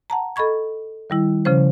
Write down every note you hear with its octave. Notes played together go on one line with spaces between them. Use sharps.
F#5 A5 A#5
A4 D#5 B5 C#6 G#6
D#3 G3 E4
C#3 F3 C#4 C5